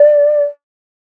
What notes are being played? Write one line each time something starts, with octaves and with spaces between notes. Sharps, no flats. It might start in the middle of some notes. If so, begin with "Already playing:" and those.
Already playing: D5